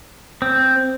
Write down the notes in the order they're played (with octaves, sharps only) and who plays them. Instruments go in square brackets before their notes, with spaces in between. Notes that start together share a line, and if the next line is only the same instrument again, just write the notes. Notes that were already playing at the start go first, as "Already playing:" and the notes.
[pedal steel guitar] C4